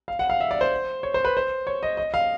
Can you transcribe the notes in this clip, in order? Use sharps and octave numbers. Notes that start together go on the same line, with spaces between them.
F5
F#5
F5
E5
D5
C5
C#5
C5
B4
C5
C#5
D#5
D#5
F5